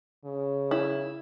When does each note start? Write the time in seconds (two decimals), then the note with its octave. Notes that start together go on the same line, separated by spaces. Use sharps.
0.24 C#3
0.71 E4